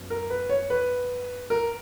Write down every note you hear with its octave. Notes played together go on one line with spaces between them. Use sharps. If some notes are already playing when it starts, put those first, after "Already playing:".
Already playing: F#2 B3
A#4
B4
C#5
B4
A#4